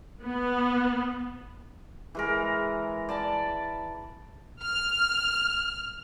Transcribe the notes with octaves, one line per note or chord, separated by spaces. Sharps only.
B3
E3 G#3 A#4
D5 A5 B5
F6